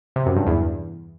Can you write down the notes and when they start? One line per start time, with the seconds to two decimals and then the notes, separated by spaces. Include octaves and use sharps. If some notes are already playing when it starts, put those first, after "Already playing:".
0.16 C3
0.26 F#2
0.36 G2
0.47 E2